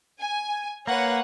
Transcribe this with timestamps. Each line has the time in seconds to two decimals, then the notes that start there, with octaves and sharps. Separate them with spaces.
0.21 G#5
0.87 A#3 B4 C#5 F#5